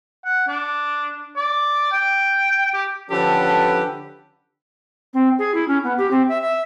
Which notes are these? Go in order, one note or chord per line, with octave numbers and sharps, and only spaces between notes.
F#5
D4
D5
G5
G4
D3 F3 C#4 G4 A4 B4
C4
G#4
E4
C#4
B3
G4
C4
E5
E5